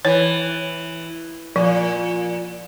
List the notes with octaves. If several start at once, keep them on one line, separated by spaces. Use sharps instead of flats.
E3 C#5
A#2 F3